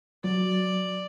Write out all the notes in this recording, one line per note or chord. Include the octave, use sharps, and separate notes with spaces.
F#3 D5